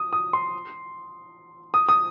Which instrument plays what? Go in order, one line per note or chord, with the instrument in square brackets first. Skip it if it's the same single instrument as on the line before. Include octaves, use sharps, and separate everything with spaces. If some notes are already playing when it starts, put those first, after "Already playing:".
Already playing: [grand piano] D#6
D#6
C6
D#6
D#6